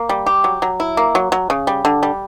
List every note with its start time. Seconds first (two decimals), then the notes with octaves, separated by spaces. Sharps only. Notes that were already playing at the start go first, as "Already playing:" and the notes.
Already playing: A#3
0.09 G3
0.26 G4
0.44 F#3
0.62 F#3
0.80 E4
0.97 A#3
1.15 F#3
1.32 F#3
1.50 C#3
1.67 G3
1.85 D3
2.03 G3